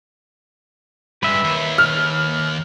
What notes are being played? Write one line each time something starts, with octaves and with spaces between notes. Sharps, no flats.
G2 G#3 B4 E5
D#2
F6